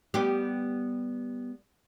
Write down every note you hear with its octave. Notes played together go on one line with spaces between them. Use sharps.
G3 B3 G4